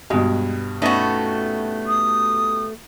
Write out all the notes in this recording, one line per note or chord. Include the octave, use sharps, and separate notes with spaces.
G2 B2 G#3
A3 B3 C#4 D#4 F#4
D#6